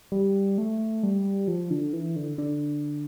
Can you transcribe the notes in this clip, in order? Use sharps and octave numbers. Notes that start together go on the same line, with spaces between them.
G3
A3
G3
F3
D3
E3
D3
D3